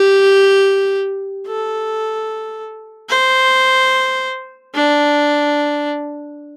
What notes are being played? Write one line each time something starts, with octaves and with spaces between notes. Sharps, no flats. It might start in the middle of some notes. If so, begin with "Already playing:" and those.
Already playing: G4
A4
C5
D4